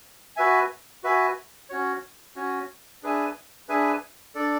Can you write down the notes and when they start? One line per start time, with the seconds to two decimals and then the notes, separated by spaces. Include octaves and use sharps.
0.36 F#4 B4 E5 G#5
1.04 F#4 B4 E5 G#5
1.70 C#4 F#4 C#5
2.36 C#4 F#4 C#5
3.03 D4 G#4 B4 E5 G#5
3.69 D4 G#4 B4 E5 G#5
4.35 D4 A4 D5